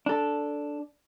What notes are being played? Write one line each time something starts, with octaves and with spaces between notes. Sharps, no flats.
D4 A4